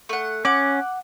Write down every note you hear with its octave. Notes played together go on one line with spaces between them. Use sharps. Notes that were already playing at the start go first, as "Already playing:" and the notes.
A3 F#5
C#4 F#5 D6